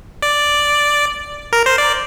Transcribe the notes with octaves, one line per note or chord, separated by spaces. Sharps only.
D5
A#4
C5
D5